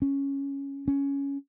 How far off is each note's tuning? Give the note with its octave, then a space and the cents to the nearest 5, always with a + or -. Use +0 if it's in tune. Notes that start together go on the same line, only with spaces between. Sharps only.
C#4 +0
C#4 +5